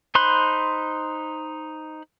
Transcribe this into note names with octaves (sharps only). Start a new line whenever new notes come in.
D#4 C5 B5 C6 F#6